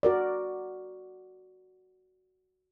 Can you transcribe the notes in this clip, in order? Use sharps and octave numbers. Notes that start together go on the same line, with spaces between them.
F#4 A#4 D5